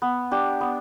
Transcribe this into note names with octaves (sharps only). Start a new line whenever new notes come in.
B3
D4 G4
B3